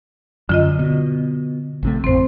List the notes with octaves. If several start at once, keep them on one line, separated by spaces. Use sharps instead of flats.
F#2 D3 F4 D#5
B2
A#1 C3 A3
A1 F2 C4 C5